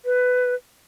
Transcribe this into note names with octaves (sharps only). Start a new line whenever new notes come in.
B4